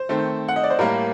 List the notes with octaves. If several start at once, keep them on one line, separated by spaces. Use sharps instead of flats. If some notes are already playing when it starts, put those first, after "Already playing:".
Already playing: C5
D#3 A3 C4
F#5
D#5
D5
C5
A2 G3 A#3 A#4